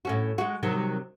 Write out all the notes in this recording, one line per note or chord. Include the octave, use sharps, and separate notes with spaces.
A2 C#4 F#4
G#3 F#4
C3 D#3 F#3